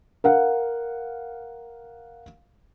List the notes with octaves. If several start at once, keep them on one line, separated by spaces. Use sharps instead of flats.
A#4 F5 F#5